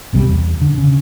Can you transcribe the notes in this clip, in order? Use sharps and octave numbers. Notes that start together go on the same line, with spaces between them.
B1 C3 F3 G3
E2
D3
C#3